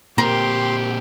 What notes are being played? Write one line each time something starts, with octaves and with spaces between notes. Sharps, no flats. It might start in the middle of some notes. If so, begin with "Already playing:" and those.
A#2 C4 G4 A#4 C6